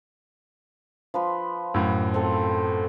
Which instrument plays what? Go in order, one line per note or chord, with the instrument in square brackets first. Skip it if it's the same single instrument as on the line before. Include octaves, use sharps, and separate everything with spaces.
[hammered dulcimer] F3 B4 C6
[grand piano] F#2 A2
[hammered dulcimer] C4 A4